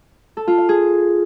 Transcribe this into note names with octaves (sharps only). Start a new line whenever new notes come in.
A4
F4
F5
G#4